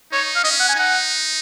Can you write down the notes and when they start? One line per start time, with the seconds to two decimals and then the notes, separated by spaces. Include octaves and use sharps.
0.12 D#4 C#5
0.36 F5
0.44 C#4 D#5
0.60 F#5
0.69 G#5
0.76 D#4 F#5